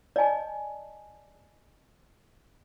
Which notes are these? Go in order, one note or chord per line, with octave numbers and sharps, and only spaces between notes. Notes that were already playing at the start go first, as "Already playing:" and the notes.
D5 D#5 G#5 A5